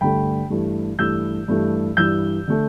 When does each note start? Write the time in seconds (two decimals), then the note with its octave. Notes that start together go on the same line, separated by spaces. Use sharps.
0.01 G2 D3 A3 G5 B5
0.50 G2 E3 A3
0.99 G2 E3 A3 E6 G6
1.48 G2 E3 A3
1.97 G2 E3 G3 E6 G6
2.48 D3 A3